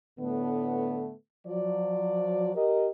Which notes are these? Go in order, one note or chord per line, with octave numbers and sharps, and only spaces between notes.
A2 D3 A3 B3
F3 F#3 D5
G4 A#4 D#5